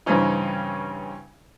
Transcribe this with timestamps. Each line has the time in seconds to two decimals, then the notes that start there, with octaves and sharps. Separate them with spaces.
0.06 G2 C#3 E3 C4 C#4 D#4